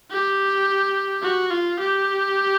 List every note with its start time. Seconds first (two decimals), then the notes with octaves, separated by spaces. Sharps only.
0.11 G4
1.23 F#4
1.51 F4
1.79 G4